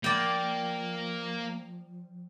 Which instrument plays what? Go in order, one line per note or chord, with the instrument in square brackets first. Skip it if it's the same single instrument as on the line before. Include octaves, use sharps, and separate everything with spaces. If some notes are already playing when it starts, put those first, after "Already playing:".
[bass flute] F3 [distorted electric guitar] A#3 [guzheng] D5 G5